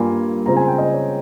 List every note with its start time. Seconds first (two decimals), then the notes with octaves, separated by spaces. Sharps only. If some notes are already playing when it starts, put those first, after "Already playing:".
Already playing: G2 G3 A#3 F4 G#5
0.46 C#3 G#3 C4 F4 A#5
0.57 G#5
0.68 G5
0.78 D#5
0.94 C#5